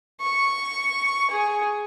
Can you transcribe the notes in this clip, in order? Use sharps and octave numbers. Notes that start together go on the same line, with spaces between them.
C#6
G#4